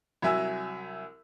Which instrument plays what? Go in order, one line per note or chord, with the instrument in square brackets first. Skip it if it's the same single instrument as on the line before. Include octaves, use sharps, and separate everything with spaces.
[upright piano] C2 F#3 E5 G#5 E6